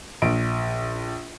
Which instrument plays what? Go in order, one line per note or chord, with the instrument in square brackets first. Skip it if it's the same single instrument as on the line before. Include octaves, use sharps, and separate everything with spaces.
[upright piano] A#1 D7